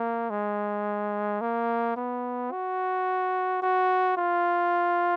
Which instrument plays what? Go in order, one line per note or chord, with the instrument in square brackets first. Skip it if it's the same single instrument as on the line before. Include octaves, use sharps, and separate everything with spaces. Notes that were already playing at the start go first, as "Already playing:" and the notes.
Already playing: [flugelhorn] A#3
G#3
A#3
B3
F#4
F#4
F4